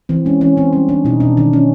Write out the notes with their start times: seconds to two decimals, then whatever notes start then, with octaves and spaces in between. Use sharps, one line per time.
0.09 E3 C4
0.25 G#3 C#4
0.41 E3 C#4
0.57 E3 C4
0.73 G3 C#4
0.89 E3 D4
1.05 B2 D#4
1.20 B2 D4
1.37 D#3 D4
1.53 D#3 C#4